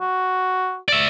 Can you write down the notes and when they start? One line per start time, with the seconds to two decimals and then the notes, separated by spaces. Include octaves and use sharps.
0.01 F#4
0.89 D5 E5